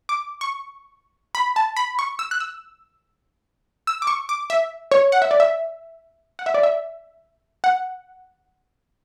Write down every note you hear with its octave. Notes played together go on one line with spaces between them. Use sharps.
D6
C#6
B5
A5
B5
C#6
E6
F#6
E6
E6
D6
C#6
D6
E5
C#5
F#5
E5
D5
E5
F#5
E5
D5
E5
F#5